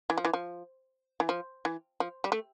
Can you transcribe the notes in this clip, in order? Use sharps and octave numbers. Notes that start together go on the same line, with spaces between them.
E3
F3
E3
F3
E3
F3
E3
F3
G3
A3